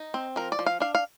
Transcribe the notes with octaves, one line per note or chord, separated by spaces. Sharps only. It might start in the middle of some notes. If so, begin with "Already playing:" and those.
Already playing: D#4
C4
F3 A#4
D5
F3
F5
D4 F5
F5